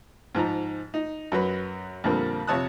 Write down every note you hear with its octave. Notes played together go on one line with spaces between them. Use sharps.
G#2 F3 D#4 A#5
D#4
F#2 F#3 B4
F2 A#2 D3 G3 A#3 C4
F2 C3 C#5 A5 D#6 F#6